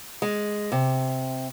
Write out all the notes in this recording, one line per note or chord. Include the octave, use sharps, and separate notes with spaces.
G#3
C3